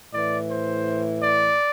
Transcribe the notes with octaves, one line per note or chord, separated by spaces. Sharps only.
A2 E3 D5
C5
D5